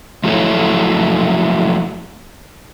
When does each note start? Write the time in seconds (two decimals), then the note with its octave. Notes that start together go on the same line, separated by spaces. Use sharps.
0.24 F3 F#3 A3 E4 A4 C#5